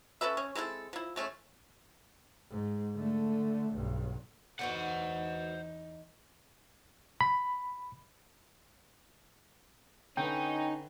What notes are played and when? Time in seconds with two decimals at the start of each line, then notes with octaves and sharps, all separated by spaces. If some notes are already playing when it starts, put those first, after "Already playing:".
0.21 C#4 A4 B4 E5
0.37 C#4
0.55 G#3 C4 E4 A4
0.93 F3 E4
1.16 G#3 A3 C#4
2.50 G#2
2.95 D3 A3
3.74 B1 G2
4.59 E2 D3 B3 D#4 F#4 C5 F#5
7.21 B5
10.17 D3 C#4 D#4 B4 G5